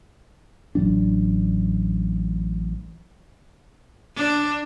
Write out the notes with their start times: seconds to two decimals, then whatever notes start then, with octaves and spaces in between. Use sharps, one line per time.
0.75 A1 A2 F#3 D4
4.16 D4